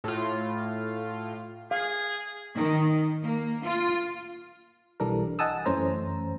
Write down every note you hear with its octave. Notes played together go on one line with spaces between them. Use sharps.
A2 F4
G#4 F5
D#3
A#3
F4
B1 E3 G3 D4 A4 A#4
D#5 F#5 G#5 A5 D#6 E6
F#2 E3 A3 C#4 C5 A#5